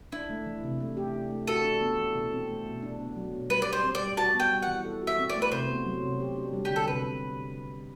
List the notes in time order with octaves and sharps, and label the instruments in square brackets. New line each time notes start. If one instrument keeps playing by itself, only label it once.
[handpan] D4 [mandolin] E4
[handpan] A3
E3
C3
A3
G4
D4
A3
[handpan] F#4 [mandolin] A4
[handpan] D4
B3
E3
B2
C4
A3
B2
D4
B3
F#3
B2
[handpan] G3 [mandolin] B4
[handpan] G4 [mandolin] D5
[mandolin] C5
[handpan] C4
[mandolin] D5
[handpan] G3
[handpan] F#4 [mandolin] A5
[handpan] B3
[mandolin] G5
[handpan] G3
[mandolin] F#5
[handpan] E3
A4
F#4
[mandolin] E5
[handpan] C4
[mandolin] D5
[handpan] A3
[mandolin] B4
[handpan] C3 [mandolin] C5
[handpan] B3
F#3
C3
G4
D4
G3
[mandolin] G4
[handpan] D3
[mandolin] A4
[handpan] C3 [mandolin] B4